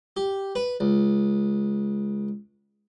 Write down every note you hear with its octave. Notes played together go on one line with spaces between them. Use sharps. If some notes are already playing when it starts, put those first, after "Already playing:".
G4
B4
C#2